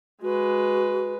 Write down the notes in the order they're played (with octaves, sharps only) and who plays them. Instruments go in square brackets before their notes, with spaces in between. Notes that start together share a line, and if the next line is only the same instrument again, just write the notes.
[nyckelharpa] G#3 B4 [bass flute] F#4